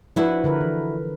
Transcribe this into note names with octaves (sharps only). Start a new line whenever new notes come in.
F3 D4 E4 F#4 B4
D3 A#4 B4
E3